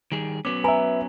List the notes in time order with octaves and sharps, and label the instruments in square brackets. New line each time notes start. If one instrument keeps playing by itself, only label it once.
[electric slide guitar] D#3 G3 G#4
[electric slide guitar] F#3 B3 C#4 [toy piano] D6
[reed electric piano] B4 E5 [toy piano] G#5 A#5 B5